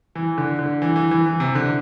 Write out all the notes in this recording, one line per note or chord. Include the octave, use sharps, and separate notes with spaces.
E3
D3
D3
E3
E3
E3
E3
C3
D3